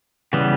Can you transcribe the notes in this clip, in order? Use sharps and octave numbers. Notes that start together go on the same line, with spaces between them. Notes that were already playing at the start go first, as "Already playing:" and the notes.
C#3 E3 G3 B3